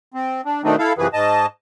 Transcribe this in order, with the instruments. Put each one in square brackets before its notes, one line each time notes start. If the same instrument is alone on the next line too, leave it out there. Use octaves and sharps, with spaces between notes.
[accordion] C4
D4
B2 D#3 A3 C4 D4 D#4
E4 A4 F5
F#2 C3 E3 F3 G#4 B4
G#2 D#5 A5